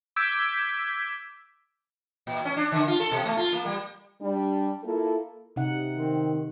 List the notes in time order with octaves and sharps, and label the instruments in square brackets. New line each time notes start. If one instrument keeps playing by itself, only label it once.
[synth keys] D6 E6 G6 G#6 B6 D7
[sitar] A#2
C#4
D4
D3
F4
A4
B2
A3
F4
A#3
G3
[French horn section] G3 D4
A#3 E4 F4 A4
[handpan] C3 D#4 F#5
[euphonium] D#3 [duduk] C4